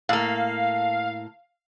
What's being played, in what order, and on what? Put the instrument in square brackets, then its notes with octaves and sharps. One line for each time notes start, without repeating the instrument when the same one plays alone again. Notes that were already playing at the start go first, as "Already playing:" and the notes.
[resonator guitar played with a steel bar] A2 A#3 [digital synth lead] F5